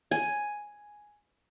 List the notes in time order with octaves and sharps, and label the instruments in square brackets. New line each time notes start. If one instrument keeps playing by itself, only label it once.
[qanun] G#5